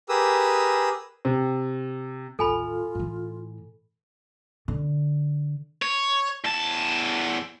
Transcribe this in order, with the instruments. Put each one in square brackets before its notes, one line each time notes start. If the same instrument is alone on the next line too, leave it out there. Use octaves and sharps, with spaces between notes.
[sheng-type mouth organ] G4 G#4 A#4 B4 D#6 E6
[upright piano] C3
[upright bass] A1 D#2 [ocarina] F4 [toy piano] A4 G#5 B5
[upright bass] A2 E3
D3
[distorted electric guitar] C#5
E2 A5